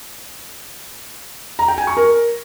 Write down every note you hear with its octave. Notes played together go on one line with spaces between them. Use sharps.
A#5
G5
G#5
C#6
A#4